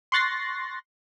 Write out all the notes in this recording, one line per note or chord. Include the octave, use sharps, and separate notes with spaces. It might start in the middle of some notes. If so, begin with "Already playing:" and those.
C6 C#6 F#6 A6 A#6 C7